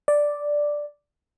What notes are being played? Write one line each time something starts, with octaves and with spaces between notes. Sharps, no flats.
D5